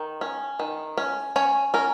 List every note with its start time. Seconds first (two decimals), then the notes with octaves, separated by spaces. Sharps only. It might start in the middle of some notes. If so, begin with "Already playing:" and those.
Already playing: D#3
0.21 C#4
0.60 D#3
0.98 C#4
1.36 C#4 C#5
1.74 C#4 A#4